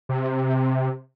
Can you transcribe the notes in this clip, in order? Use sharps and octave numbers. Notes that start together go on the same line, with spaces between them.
C3